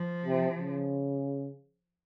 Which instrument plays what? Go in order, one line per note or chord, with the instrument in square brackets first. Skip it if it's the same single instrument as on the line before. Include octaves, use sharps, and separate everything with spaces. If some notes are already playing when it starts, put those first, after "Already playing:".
Already playing: [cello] F3
[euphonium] C3
C#3